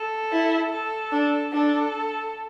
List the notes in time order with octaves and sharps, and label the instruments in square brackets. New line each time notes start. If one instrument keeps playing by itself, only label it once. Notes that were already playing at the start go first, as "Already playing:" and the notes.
Already playing: [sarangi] A4
[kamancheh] E4
[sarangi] A4
[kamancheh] D4
[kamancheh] D4 [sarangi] A4